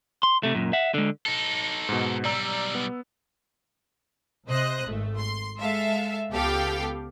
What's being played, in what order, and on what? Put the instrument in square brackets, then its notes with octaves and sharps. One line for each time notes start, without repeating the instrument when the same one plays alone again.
[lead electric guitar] C6
C3 A3
F#2 A#2
E5 F#5
D3 G#3
[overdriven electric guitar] D#4 A4
[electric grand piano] G#2 B2
[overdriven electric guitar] B1 G3 [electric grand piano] D5 A#5 E6
[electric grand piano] B3
[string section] C3 C5 D#5 F#6
G#1 A3
C6 C7
G#3 A4 E5 F5
C#2 B3 G4 A4 F5 G5